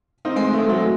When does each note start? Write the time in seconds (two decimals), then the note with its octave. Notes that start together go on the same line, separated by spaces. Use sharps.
0.25 C4 D#4
0.36 G#3 C4
0.47 G#3
0.53 A3
0.58 G#3 C4
0.69 F#3 A3
0.80 G#3